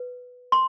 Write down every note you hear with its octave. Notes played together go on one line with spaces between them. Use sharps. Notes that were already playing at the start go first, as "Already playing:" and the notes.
Already playing: B4
C6